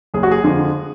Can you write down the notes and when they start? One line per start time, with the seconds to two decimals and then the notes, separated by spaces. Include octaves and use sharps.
0.14 F#1 G#4
0.23 F#4
0.31 G#4
0.44 F2 D3 F3 G#3